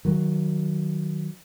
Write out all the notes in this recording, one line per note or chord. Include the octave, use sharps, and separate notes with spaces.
D#3 F#3